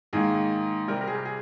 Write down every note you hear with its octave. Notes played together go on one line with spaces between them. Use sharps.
G#2 D#3 A#3 G#4
C3 G3 C4 A#4
A#4
G#4
G4
G#4